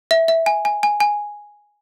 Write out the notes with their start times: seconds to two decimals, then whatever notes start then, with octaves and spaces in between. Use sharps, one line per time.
0.11 E5
0.28 E5
0.46 G#5
0.65 G#5
0.83 G#5
1.00 G#5